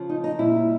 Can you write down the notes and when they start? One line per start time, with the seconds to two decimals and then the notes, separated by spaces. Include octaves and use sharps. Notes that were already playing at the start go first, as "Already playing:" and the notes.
Already playing: C#3 F3
0.09 D#4
0.24 D#4
0.39 A#2 G3 E4